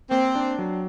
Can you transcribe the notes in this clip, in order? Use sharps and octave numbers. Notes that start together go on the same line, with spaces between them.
A#3 C4
D4
F#3